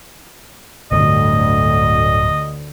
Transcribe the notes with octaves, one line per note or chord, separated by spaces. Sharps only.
D1 D2 G2 D3 D#5